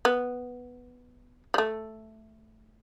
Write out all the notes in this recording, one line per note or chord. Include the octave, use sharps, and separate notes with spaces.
B3
G3
A3